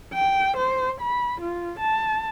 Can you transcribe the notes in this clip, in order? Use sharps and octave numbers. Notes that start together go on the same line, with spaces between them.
G5
C5
B5
F4
A5